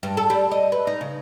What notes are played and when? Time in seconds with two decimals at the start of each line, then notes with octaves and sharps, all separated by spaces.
0.03 G2
0.17 A4
0.30 G3
0.51 D#5
0.72 B4
0.87 D#4
1.01 C#3